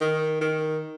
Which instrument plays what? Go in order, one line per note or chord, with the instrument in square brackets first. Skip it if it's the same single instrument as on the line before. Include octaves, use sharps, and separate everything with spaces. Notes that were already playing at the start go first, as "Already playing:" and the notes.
[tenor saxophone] D#3
D#3